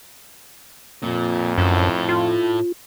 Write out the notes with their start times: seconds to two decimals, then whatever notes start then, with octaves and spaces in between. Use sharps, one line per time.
1.03 F2 A#2
1.58 F#2 A2 A4
2.09 F4